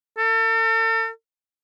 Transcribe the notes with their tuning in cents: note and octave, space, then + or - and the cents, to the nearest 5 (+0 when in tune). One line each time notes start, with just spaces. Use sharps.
A4 +40